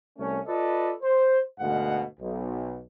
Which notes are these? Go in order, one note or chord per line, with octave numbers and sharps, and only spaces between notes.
C2 A3 C#4
F4 A4 B4 D5 D#5
C5
D2 G#2 B2 F5 F#5
B1